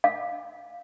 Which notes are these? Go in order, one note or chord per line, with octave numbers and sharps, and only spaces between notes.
F5